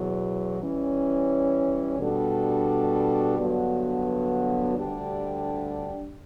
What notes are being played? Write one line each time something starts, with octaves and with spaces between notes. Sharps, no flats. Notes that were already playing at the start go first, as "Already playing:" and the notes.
Already playing: E2 B2 F#3
E3 G3 C#4
B2 G3 D4 F#4 A4
G2 D3 F#3 B3 F#4
D2 D3 G3 D4 G4